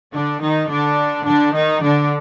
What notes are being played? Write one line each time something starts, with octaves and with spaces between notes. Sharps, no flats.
D3 D4
D#3 D#4
D3 D4
D3 D4
D#3 D#4
D3 D4